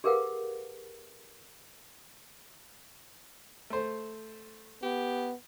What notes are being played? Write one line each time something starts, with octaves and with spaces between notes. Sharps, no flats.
G4 G#4 A#4 B4 F5 F#5
A3 C5
B3 G4